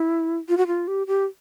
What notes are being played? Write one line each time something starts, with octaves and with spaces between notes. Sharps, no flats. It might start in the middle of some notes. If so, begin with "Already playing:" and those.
Already playing: E4
F4
F#4
F4
G4
G4